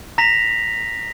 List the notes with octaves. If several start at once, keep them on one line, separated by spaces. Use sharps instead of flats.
A#5 A#6 B6 F7